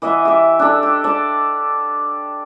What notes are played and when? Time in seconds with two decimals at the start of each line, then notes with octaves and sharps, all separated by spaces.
0.02 E3 D#5 E5 F#5
0.25 G4 E5
0.59 D4 A4
0.83 G4
1.04 D5 A5